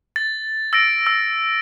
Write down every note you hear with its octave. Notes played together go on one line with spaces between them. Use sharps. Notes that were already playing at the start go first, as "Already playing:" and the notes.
A6
E6 A6 A#6 D7
E6